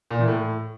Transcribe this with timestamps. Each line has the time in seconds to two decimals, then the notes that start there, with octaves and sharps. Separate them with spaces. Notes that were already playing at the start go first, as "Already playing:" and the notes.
0.11 A#2
0.19 E3
0.28 A2